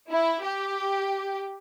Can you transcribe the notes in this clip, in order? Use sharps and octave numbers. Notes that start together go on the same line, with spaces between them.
E4
G4